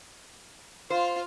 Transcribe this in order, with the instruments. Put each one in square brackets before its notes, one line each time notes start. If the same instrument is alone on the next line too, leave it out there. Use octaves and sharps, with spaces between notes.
[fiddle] F4 F5 [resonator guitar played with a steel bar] C5